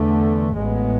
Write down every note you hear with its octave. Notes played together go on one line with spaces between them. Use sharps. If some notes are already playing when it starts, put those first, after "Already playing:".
Already playing: E2 D3 A3
A1 A2 G#3 B3